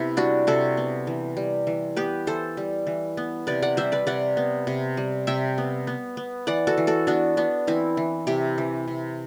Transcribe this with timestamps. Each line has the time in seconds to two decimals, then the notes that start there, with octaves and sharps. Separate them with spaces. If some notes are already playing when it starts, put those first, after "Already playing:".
Already playing: C3 B3 E4
0.17 G3 D4 F#4
0.47 C3 F#4 A4
0.77 B3
1.07 E3
1.37 G3
1.67 E3
1.96 B3 G4 B4
2.27 E3 A4 C5
2.57 G3
2.87 E3
3.17 B3
3.47 C3 B4 D5
3.62 D5 F#5
3.77 G3 C5 E5
3.92 B4 D5
4.07 C3 D5 F#5
4.37 B3
4.67 C3
4.97 G3
5.27 C3 E5 G5
5.58 B3
5.87 B3
6.17 B3
6.47 E3 D5 F#5
6.67 F#4 A4
6.78 E3
6.87 F#4 A4
7.07 B3 D4 F#4
7.37 B3 D4
7.67 E3 C4 E4
7.97 E3
8.27 C3 E4 G4
8.58 E3
8.88 C3